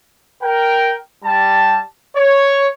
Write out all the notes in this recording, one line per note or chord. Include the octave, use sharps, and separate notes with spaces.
A#4 G5
G3 A5
C#5